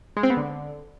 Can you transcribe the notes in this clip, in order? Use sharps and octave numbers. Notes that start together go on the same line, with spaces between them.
G#3
C4
B3
D3